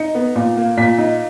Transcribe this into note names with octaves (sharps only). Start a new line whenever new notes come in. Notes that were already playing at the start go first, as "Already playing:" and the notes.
Already playing: D#4 C#7
B3
A#2
A#3
A#2 B6
D#4